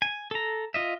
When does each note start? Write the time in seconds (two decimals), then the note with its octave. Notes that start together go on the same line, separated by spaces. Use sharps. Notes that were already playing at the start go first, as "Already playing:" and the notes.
0.02 G#5
0.31 A4 A#5
0.74 F4 D#5 E5